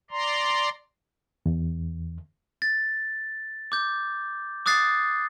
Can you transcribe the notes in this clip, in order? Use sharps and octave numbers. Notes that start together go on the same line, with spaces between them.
D5 A#5 C6
E2
A6
D6 G6
D6 D#6 F#6 A6 C7